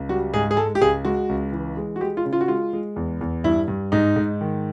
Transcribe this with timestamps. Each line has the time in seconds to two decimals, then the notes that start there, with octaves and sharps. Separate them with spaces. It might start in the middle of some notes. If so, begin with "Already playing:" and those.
Already playing: C#2
0.09 G3 F#4
0.34 G#2 G#4
0.51 G#4
0.57 G#3 A4
0.75 G4
0.81 C#2 G#4
1.05 G#3 F#4
1.29 C#2
1.52 E3
1.77 G#3
1.96 F#4
2.01 G#3 G4
2.17 F4
2.25 C#3
2.33 F4
2.41 F#4
2.48 G#3 F4
2.73 G#3
2.96 E2
3.21 E2
3.44 G2 E4
3.68 G2
3.92 G#2 D#4
4.16 G#2
4.41 D#3